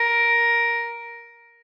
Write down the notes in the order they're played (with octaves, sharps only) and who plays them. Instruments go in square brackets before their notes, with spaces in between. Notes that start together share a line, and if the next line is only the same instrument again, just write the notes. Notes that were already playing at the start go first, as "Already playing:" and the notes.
Already playing: [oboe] A#4